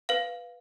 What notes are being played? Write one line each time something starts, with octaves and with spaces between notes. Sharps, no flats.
B4 F5